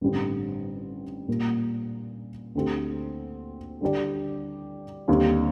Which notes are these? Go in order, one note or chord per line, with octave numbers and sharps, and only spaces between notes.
A1 G2 D3 G3 C4
A#2 G3 A#3
D2 D3 A3 C4 G4
D3 G3 D4 G4 D5
D#2 D3 G3 C4 G4